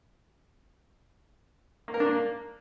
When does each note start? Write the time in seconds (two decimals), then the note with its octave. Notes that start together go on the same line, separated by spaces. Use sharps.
1.88 A#3
1.94 A#4
2.00 D4
2.06 A#3